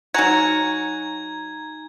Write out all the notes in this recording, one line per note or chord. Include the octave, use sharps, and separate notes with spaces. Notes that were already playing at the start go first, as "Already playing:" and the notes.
F#3 D#4 F#4 G#5 A#5 G#6